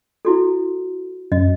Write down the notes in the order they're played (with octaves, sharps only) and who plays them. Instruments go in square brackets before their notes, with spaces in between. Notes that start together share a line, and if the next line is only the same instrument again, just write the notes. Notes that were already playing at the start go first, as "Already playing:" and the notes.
[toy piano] E4 F#4 A4
[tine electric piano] F#2 [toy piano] D#5